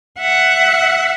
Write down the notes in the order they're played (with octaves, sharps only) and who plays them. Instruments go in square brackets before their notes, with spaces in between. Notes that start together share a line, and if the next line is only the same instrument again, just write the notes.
[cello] E5 F#5